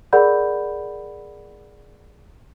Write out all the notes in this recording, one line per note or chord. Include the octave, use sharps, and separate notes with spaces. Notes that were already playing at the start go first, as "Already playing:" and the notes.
G#4 A#4 D5 F#5 B5 G6